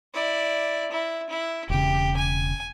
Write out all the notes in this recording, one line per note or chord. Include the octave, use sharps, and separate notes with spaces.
E4 D5
E4
E4
E1 C#3 G4
G#5